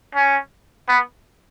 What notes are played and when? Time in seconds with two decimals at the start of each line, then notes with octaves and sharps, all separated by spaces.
0.15 C#4
0.88 B3